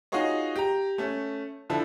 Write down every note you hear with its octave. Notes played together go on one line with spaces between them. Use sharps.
D#4 F4 F#4 G#4 C#5 D#5
G4 A#5
A3 C#4
D3 F3 E4 A4